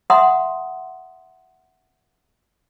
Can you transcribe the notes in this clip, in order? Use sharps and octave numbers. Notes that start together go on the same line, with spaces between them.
E5 F#5 A#5 C6 D#6